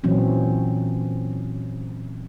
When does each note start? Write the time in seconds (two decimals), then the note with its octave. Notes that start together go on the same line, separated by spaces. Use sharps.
0.04 A#2 E3 F#3 C4 C#4